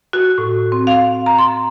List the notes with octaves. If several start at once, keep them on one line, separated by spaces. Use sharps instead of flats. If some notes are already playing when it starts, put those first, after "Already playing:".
F#4
A2
C4
F5
A#5
C6